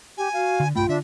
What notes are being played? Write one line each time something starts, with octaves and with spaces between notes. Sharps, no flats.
G4 G#5
F#4 F5
D3
B1 G2 A3 F4 G5 B5
D3 D4 E5